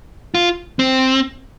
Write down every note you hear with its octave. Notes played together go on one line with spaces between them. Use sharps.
F4
C4